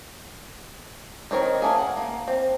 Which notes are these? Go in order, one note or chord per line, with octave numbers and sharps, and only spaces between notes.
D#3 C4 D#4 A#4 C#5
A3 A#3 C#4 G#4
F#5
A#3
C4